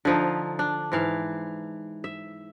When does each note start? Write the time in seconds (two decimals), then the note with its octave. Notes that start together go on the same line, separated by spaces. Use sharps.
0.05 D3 F3 D#4
0.59 D4
0.92 G#2 E3 F5
2.04 E5